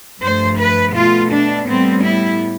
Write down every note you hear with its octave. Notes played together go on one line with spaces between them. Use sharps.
G2 F3 A3 C5
B4
B2 A3 F4
D4
A2 G3 B3 C4
E4